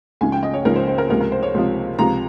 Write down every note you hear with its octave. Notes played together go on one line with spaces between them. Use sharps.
C#2 C#3 F3 G#5
G5
D#5
C#5
C#2 C#3 F3 A#4
C5
C5
A#4
C#2 C3 F3 A#4
A#4
C5
C#5
C#2 C3 F3
C#2 C3 F3 A#5